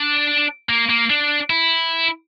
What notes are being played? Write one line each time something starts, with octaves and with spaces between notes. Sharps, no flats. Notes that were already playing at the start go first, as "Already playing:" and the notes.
Already playing: D4
A#3
A#3
D4
E4